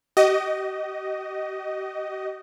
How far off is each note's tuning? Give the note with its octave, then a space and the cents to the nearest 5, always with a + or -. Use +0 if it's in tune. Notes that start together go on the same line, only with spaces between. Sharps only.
G4 -45 D#5 +0